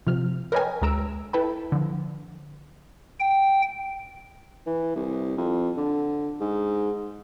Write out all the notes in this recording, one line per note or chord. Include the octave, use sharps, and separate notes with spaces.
C3 F3 F6
A#4 B4 C#5 D#5 G5 G#5
D2 G#3 A#5 E6 D7
E4 A4 B4 G5 A5 B5
D3 F3
G5
E3
C2
F2
D3
G#2